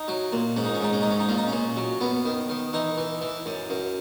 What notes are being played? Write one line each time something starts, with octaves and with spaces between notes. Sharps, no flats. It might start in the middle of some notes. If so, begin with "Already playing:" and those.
Already playing: D#4
F#3
A#2
G#2 C#4
D#4
C#4
G#2 D#4
C#4
G#2 D#4
C#4
D#4
A#2 C#4
D#4
C#4
A#2
F#3
F#2 B3
D#3
D#3
E3 D#4
E3
E3
F#2
F#2